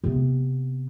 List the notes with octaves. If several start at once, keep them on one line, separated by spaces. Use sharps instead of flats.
C3 B3